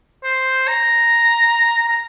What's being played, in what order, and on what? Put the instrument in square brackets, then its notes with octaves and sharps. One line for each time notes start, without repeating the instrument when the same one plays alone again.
[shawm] C5
A#5
A#5